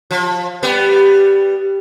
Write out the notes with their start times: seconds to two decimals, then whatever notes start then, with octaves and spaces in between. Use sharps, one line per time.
0.11 F3
0.63 G3 B3